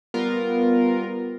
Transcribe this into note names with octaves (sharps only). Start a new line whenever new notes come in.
G3 B3 F4 A#4